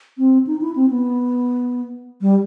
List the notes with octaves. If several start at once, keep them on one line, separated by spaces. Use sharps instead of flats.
C4
D#4
E4
C4
B3
G3